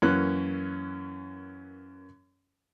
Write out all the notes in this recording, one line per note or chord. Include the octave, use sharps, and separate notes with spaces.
F#2 E3 A#3 C#4 F#6